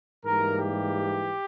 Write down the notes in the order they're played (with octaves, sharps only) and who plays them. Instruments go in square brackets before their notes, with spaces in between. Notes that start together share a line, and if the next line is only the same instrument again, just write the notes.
[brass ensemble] G#2 E3 G3 A#3 A#4
G4